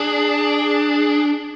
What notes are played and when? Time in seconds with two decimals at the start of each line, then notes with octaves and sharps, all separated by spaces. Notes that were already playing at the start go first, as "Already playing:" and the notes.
Already playing: D4 G#4